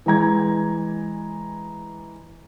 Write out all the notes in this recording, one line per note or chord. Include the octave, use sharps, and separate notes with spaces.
E3 G#3 A#5 G#6